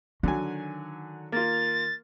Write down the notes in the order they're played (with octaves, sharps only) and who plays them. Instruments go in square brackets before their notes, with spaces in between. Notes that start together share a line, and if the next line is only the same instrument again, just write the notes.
[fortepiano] D3 F#3 G#5 [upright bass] D#3
[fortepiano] A#3 F4 [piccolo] A6